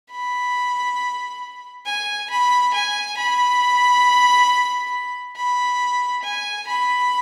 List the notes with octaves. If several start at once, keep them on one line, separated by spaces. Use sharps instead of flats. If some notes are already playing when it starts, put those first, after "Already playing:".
B5
G#5
B5
G#5
B5
B5
G#5
B5